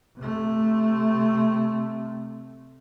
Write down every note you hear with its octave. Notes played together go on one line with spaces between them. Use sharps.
C3 A3